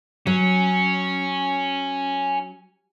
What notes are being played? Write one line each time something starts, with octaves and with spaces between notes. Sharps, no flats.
F#3 C#4